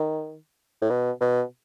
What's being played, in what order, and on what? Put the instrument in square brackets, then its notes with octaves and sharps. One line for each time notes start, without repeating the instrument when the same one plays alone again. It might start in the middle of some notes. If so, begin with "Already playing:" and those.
Already playing: [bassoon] D#3
A2
B2
B2